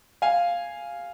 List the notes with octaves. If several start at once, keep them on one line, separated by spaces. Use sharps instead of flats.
F5 G#5